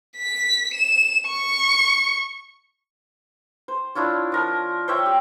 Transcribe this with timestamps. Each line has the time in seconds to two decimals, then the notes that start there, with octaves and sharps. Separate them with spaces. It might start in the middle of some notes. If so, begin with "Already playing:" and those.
0.17 B6
0.74 E7
1.27 C#6
3.68 C5
3.95 D4 E4 F4 C#5
4.32 F3 A#4
4.88 C5 C#5 E5 G5
5.06 G4